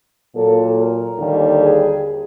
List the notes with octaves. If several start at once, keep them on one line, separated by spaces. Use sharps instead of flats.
A#2 F#3 A#3 A4
A#4
D#2 D3 G3
G#4